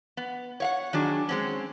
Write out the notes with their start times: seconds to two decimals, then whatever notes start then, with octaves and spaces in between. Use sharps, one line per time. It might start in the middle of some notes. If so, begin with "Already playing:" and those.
0.17 B3
0.60 C#5 F5 F#5
0.93 D#3 F#3 D4 G#4
1.29 G#3 C4 C#4